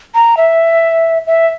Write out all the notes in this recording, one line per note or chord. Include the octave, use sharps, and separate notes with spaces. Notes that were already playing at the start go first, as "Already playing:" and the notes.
A#5
E5
E5